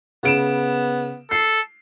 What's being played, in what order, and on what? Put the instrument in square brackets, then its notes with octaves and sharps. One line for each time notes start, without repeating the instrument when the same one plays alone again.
[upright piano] C#3 D7 E7 [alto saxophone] B3
[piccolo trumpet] A4 [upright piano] C7